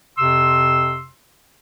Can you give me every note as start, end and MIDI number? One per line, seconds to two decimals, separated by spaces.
0.17 1.07 41
0.17 1.07 48
0.17 1.07 84
0.17 1.07 88